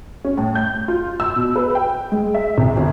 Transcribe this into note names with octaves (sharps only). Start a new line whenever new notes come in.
C#4
A2
G6
F4
E6
B2
B4
G5
G#3
E5
C2
G1